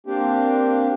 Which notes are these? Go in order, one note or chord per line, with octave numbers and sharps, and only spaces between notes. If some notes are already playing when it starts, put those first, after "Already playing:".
A#3 C4 D4 G4